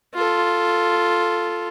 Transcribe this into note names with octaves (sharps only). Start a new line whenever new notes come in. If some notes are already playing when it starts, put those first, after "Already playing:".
F4 A4